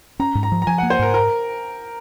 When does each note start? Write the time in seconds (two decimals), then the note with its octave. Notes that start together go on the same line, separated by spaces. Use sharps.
0.19 C#4 A#5
0.35 G#2
0.43 A#5
0.52 F3
0.62 A#5
0.67 F3 G#5
0.78 A#3 F#5
0.90 C5
0.99 G#2 A#4
1.14 A#4